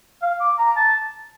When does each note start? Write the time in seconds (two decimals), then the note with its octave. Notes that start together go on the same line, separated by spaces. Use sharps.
0.22 F5
0.40 D6
0.58 A#5
0.76 A5